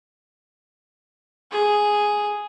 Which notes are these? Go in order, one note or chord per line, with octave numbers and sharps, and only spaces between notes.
G#4